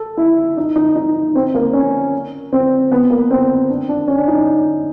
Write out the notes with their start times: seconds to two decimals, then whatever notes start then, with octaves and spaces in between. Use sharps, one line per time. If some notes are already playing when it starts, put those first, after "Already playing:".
Already playing: A4
0.17 E4
0.57 D#4
0.76 D#4
0.96 D#4
1.35 C4
1.54 A#3
1.73 C#4
2.53 C4
2.92 B3
3.10 A#3
3.31 C4
3.70 D4
3.88 D4
4.07 C#4
4.17 D4
4.28 D#4